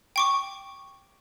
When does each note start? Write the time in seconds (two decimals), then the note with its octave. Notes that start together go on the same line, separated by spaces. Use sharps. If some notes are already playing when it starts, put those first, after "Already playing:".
0.16 G5 C#6 D6